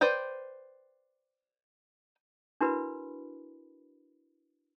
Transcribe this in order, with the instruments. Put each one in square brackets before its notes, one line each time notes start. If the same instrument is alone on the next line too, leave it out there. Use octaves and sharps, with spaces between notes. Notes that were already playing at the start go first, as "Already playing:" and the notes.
[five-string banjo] B4 C5 D5 G5
[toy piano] D4 E4 F#4 A#4 B4 B5